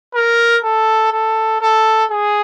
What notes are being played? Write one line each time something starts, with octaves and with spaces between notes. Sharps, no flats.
A#4
A4
A4
A4
G#4